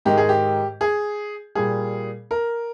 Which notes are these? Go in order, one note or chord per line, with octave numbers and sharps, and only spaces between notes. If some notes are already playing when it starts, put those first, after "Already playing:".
G#2 D#3 G#3 G4
G#4
G4
G#4
A#2 G3 G#4
A#4